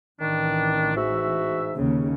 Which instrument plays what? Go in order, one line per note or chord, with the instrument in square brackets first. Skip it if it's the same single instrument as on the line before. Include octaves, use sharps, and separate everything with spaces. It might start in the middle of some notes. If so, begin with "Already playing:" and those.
[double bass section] A1 E3 [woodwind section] D#3 D4
[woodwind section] G#2 F#4 E5
[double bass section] D#2 C#3